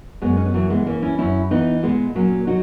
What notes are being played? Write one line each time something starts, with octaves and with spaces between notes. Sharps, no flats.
F#2 G#3 B3
C#4
B3
E3 F#3 A#3
G#3 B3
E3 A#3 C#4
C#4 E4
F#2 C#4 E4
E3 B3 D#4
A#2 G#3 B3
F#3 A#3 C#4
F#3 D#4 F#4